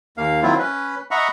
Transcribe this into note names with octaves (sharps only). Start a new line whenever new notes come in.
D#2 A#3 F5
D#3 F#3 C4 E4 F4
C#4 B4
D#5 E5 F#5 A#5 B5 C#6